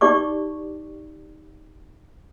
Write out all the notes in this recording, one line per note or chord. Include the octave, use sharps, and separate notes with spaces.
D#4 G4 D5 C#6 D6